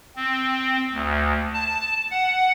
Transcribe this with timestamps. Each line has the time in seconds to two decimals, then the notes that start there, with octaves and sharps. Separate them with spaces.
0.16 C4
0.93 D2
1.54 A5
2.11 F#5